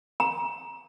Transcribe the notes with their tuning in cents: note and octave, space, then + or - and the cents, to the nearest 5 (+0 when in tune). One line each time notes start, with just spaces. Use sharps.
A#5 +30